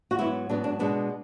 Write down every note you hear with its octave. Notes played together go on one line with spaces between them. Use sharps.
F#4
G#2 F#3 B3 E4
G#2 F#3 B3 D4
D4
B2 G#3 B3 D4